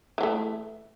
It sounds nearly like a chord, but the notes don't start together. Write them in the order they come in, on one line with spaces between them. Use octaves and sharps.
E3 F#3 A3